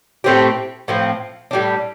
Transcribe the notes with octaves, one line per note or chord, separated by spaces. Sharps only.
A2 A3 C4 G4
A2 F3 C4
A2 G3 D4